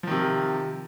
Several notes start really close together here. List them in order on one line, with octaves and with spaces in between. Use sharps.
F3 D#3 C3